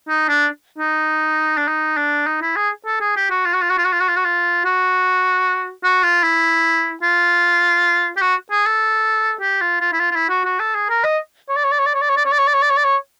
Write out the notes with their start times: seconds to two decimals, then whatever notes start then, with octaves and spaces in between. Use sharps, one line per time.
0.09 D#4
0.28 D4
0.78 D#4
1.57 D4
1.68 D#4
1.97 D4
2.27 D#4
2.42 E4
2.56 G#4
2.87 A4
3.01 G#4
3.16 G4
3.31 F#4
3.46 F4
3.54 F#4
3.62 F4
3.70 F#4
3.78 F4
3.85 F#4
3.93 F4
4.00 F#4
4.09 F4
4.17 F#4
4.25 F4
4.65 F#4
5.84 F#4
6.03 F4
6.23 E4
7.03 F4
8.17 G4
8.22 F#4
8.52 G#4
8.66 A4
9.41 G4
9.61 F4
9.81 F4
9.93 E4
10.00 F4
10.11 F4
10.16 E4
10.30 F#4
10.45 F#4
10.60 A4
10.75 G#4
10.90 A#4
11.04 D#5
11.49 C#5
11.56 D5
11.65 C#5
11.72 D5
11.79 C#5
11.86 D5
11.94 C#5
12.02 D5
12.10 C#5
12.17 D5
12.25 C#5
12.32 D5
12.39 C#5
12.47 D5
12.54 C#5
12.62 D5
12.70 C#5
12.77 D5
12.85 C#5